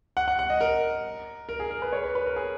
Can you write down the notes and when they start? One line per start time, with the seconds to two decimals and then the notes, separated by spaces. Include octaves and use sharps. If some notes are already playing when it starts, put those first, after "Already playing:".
0.17 F#5
0.28 F#5
0.39 F#5
0.50 D#5
0.61 A#4
1.49 A#4
1.60 G#4
1.71 A#4
1.82 B4
1.93 C#5
2.04 B4
2.15 B4
2.26 A#4
2.36 G#4